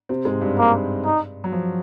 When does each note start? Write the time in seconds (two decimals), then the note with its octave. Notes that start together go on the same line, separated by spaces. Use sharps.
0.09 C3 C4
0.25 G#2 G#3
0.41 G2 G3
0.58 A#3
1.05 D#4
1.44 F#3
1.52 F3